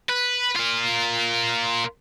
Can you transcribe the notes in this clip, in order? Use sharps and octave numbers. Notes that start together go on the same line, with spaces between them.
B4
F4 A#4